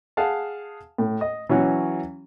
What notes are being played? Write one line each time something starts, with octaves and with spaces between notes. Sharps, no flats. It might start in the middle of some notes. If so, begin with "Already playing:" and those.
G#4 F5 F#5 A5
A2
D#5
E3 F#3 C#4 F#4